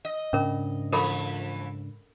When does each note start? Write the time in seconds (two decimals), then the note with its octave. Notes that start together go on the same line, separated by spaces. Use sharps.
0.05 D#5
0.33 G#2 C#3 C#4 D4 A#4
0.92 E3 F3 A4 A#4 B5